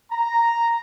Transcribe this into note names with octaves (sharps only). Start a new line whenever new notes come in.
A#5